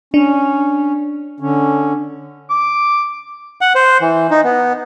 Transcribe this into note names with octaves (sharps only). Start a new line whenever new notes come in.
C#4 D4
D3 C#4
D6
F#5
C5
E3
D#4
B3